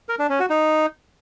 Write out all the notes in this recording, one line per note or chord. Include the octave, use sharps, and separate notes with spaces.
A#4
D4
C#4
F#4
D#4